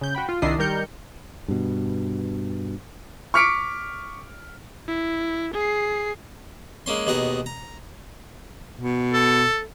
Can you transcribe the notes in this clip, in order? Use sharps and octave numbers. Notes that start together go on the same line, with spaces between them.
C#3 G6
F#4 G5 B5
F4
C2 D#3 D4 E4 D#5 C7
D#3 G3 A#4 G6 C#7
G2 B2
C#6 D6 F6 B6 C#7 D7
E4
G#4 C7
G#3 A#3 C#4 C6
D#2 B2 G#4 F#5 A#5
A#5
B2
A4